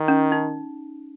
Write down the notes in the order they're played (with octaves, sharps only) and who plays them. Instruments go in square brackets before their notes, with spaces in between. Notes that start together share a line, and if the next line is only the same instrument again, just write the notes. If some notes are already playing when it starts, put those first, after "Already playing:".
Already playing: [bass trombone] D#3
[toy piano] C#4
D#4